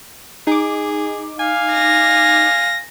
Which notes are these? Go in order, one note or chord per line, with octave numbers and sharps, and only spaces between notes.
D#4 G#4 D6
F5 G#5
A#6